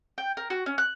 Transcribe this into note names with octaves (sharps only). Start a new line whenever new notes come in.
G5
A#4
F#4
C#4
F#6